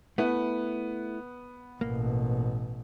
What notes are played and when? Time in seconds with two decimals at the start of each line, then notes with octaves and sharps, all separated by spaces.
0.18 A3 B3 E4
1.81 A1 B2 A#3